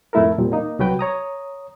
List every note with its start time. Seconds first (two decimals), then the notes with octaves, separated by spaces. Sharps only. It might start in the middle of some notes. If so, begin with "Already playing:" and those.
0.13 F2 A2 A3 E4 A4 A#4
0.38 E2 A#2 G3 C4
0.52 A#3 D#4
0.79 C2 F#3 F#4 B4 G5 G6
0.99 C#5 A#5 D#6